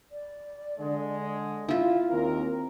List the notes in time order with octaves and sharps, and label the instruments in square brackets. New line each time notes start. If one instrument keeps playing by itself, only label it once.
[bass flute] D5
[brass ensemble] D3 G#3
[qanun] E4 F4 [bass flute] F5
[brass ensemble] D#2 A#4 [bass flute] C4